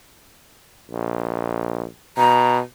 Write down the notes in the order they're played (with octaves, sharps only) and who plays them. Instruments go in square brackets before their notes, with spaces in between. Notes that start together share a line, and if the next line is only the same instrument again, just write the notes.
[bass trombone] A#1
[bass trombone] B2 [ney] A#5